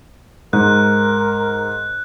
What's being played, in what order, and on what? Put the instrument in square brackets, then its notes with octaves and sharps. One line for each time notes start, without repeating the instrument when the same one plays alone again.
[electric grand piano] G#2 [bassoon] A#4 [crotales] F#6